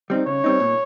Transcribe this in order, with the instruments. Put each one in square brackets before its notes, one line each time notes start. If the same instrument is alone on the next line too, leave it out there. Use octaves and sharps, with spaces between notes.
[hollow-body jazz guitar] G3 C4 D#4
[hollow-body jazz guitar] C#3 [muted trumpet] C#5
[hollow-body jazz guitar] G3 C4 D#4
A#2